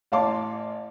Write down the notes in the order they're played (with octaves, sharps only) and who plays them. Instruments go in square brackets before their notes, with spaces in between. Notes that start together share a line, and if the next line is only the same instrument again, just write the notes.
[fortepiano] A1 C#5 F5 A5 C6 D6